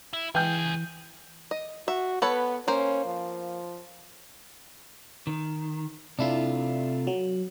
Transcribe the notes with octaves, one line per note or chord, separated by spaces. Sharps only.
E4
C#2 E3 G#4 G5 G6
D#5
F#4 E5
B3 A4 B4 C#5
A#3 C#4 C5
F3
D#3
C3 A3 D4 E4 F4
F#3